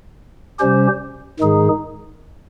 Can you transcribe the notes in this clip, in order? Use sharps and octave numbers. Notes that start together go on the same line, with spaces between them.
C3 G3 C#4 G4 C5
G#2 D#3 G#3 D#4 G#4